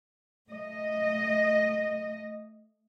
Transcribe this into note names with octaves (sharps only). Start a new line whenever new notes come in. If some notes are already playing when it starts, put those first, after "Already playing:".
A3 D#5